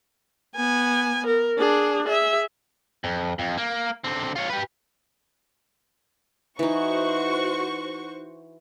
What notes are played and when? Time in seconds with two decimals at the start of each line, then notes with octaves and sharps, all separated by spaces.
0.55 B3 G#5
1.26 A#4
1.58 D4 G#4
2.06 G#4 E5
3.04 F2
3.39 F2
3.57 A#3
4.04 D3 C4
4.36 F4 C#5
4.49 G4 B4
6.59 E3 D#4 F#4 C5 C#6